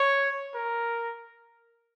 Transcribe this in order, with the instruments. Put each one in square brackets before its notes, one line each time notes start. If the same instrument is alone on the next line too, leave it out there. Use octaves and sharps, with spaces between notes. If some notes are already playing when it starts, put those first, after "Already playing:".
Already playing: [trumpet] C#5
A#4